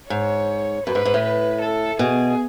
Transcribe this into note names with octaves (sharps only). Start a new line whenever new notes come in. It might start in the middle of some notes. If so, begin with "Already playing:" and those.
G#2 C#5
F#2 B4
G#2
G#2
A2
B4
A4
B2 G#4